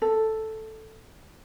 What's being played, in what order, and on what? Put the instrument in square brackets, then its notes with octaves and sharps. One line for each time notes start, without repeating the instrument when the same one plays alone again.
[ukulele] A4